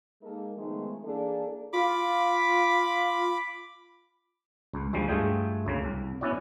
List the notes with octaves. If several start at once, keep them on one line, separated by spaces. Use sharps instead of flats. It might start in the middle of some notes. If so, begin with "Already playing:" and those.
G#3 A#3 D#4 A4 A#4
D#3 F3 G#3 A3 B3 D#4
E3 A#3 D4 G#4 A4
F4 B5 D6
C#2
D2 F3 G3 G#3
G2 A3 F4 G#4 G5
D2 C#3 A#3
C2
B3 C#4 E4 F#4 D5